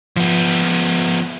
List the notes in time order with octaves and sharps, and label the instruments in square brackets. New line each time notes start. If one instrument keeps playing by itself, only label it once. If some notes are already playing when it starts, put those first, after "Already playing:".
[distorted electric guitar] F3 B3